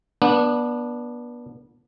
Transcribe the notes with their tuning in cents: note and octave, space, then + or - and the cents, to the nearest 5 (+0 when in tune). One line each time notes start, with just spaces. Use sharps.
B3 -30 D4 +0